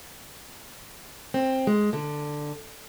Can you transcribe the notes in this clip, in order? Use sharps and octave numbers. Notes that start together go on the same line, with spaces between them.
C4
G#3
D3